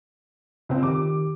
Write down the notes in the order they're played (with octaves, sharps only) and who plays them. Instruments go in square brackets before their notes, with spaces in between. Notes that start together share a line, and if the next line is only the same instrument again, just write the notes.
[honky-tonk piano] C#2 C4
[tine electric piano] D#3 G4 [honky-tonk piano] D6